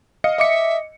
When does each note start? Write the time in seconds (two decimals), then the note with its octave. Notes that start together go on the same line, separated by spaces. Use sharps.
0.24 D#5 F5 C#7
0.38 D#5 E5 D6 C#7